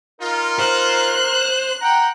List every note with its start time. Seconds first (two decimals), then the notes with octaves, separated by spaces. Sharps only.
0.21 D#4 F4 A#4
0.59 C5 F#6
1.81 F#5 G5 A#5